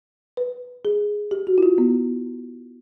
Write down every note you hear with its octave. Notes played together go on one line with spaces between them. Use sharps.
B4
G#4
G4
F#4
E4
F4
B3